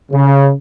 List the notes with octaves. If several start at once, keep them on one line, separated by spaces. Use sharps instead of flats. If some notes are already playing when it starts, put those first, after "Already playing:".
C#3